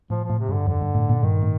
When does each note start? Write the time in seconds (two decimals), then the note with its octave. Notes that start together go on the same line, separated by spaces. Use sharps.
0.10 A2 F3
0.25 A2 F3
0.39 C3
0.49 G2 D3
0.67 F2 D3
0.82 G2
0.95 A2
1.09 A#2
1.23 G2 D#3
1.42 A2